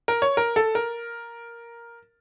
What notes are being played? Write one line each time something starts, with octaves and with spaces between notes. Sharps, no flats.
A#4
C#5
A#4
A4
A#4